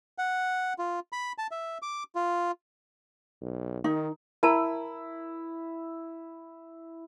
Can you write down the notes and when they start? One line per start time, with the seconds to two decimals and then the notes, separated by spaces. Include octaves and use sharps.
0.18 F#5
0.79 F4
1.13 B5
1.38 A5
1.51 E5
1.82 D6
2.15 F4
3.41 B1
3.84 D#3 D#4
4.43 E4 A#4 A5 A#5